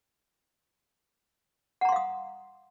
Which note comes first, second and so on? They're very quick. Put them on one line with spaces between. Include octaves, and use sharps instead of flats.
F#5 A#5 C6 F5 D#6